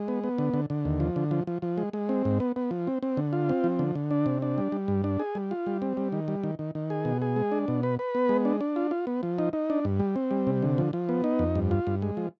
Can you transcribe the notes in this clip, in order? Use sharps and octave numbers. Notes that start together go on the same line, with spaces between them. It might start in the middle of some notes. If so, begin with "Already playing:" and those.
Already playing: G#3
B3
B3
D3
D3
D3
D#2
F3
D3
F3
F3
F3
G#3
G#3
C4
G#2
B3
B3
F3
C4
C4
D3
F4
C4
F3
D3
D3
D4
C3
D4
G3
G3
G2
D4
G#4
G3
F4
G3
C4
G3
D#3
G3
D#3
D#3
D#3
G#4
B2
G#4
G#3
D4
B2
B4
B4
B3
G#3
D4
D4
F4
F4
B3
F3
D#4
D#4
D4
G2
G3
C4
G3
C3
D3
F3
F3
B3
D#4
F2
G2
F4
G2
G#3
F3